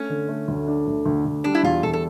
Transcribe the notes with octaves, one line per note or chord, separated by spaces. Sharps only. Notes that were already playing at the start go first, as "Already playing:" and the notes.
Already playing: A3 C#4
D3
A3
D2
D4
D2
D2
D2
G3 D4
E4
E2 F4
E2 A4
A4